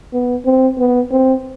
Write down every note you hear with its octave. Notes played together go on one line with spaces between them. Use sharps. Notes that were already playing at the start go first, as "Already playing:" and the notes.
B3
C4
B3
C4